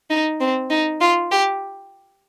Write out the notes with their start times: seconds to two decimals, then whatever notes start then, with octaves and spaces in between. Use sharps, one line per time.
0.10 D#4
0.40 C4
0.71 D#4
1.01 F4
1.31 G4